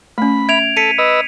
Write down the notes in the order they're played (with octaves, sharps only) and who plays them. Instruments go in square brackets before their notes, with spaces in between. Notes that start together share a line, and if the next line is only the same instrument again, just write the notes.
[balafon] A3 C#4 [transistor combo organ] B5
[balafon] E5 [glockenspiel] G#6 D7 F7
[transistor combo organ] A4 [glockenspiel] B6 C#7 D#7
[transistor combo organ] B4 D#5 E6